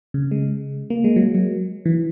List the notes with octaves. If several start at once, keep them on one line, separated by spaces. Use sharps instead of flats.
C#3
G#3
A#3
G#3
F#3
F#3
E3